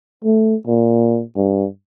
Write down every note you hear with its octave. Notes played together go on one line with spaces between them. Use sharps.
A3
A#2
G2